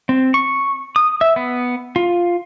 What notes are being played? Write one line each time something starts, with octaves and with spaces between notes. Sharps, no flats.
C4
C#6
D#6
E5
B3
F4